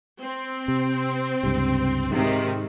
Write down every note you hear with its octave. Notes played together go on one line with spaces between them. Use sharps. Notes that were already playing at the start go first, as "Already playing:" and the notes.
C4
C3
C#2 G2 C3
G#2 C3 D#3